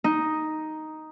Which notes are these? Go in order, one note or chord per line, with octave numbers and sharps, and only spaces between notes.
D#4